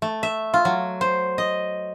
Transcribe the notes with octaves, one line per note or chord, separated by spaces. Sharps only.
A3
E5
F4
F#3
C5
D#5